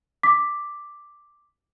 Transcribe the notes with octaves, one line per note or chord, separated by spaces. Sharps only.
D6 B6